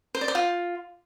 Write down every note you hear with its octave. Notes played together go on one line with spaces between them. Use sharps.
C5
D5
C5
F4